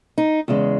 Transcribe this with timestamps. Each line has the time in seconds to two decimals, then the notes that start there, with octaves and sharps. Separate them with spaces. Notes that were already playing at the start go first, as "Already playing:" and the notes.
0.18 D#4
0.48 E2 C#3 G#3